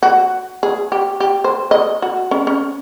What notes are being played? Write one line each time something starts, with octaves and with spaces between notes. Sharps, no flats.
F#4
G#4
G4
G4
C5
D#5
F#4
C#4
C#4